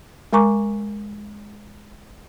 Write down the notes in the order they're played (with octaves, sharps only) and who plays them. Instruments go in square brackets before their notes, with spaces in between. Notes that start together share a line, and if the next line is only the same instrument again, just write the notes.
[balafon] G#3 A#4 G#5 A#5 C#6 D6